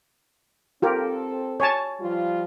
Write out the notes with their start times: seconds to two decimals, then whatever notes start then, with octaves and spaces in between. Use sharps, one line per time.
0.82 C4 F4 G4 A4 A#4
1.60 C#5 G#5 A5
2.00 F3 G3 F4